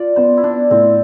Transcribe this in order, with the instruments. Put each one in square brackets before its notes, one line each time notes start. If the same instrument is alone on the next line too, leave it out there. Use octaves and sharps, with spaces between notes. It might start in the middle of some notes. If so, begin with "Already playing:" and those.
Already playing: [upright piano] F4 [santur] D5
[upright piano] B3 [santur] C5
[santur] E4
[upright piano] B3 [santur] D4
[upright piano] A2 [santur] C4